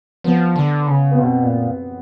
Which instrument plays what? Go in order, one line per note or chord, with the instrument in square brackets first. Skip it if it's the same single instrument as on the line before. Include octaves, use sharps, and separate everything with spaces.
[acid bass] F3 [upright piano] B3
[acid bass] D3
C#3
[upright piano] B3
[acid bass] B2 [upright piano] C4
[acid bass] A#2